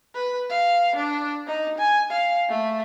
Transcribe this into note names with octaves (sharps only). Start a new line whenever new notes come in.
B4
F5
D4
D#4
G#5
F5
A3